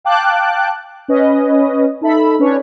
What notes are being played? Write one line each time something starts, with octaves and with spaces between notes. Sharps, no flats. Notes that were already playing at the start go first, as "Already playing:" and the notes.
F5 G5 A5 D6 F#6
C#4 B4 D#5
D#4 A4 E5 B5
C#4 D4 B4 C#5